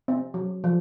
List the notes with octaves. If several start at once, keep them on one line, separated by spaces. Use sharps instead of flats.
C4
F#3
F3